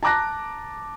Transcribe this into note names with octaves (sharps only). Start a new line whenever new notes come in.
A5 A#5 D6 F#6 A#6